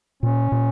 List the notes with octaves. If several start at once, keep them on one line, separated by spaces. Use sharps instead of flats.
A#2 C#4
A#2